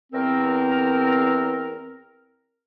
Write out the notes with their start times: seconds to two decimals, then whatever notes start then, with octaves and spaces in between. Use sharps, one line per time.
0.12 E2 C4 A#4